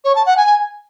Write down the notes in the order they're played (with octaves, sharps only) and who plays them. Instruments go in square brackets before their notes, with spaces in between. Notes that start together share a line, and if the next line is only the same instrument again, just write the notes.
[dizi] C#5
A5
F#5
G#5